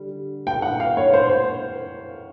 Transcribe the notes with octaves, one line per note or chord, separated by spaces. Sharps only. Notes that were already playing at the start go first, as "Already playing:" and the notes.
Already playing: D3 G3
G5
F#5
F5
C#5
C5
C5